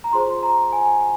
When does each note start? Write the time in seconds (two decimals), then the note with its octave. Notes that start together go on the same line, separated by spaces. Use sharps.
0.04 A#5
0.13 F4 G#4 C5 C6
0.43 A#5
0.72 G#5